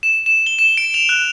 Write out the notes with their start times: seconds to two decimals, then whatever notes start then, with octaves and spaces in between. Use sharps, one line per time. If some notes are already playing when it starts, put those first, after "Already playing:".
0.03 E7
0.26 E7
0.47 G7
0.59 E7
0.77 D7
0.94 F7
1.09 F#6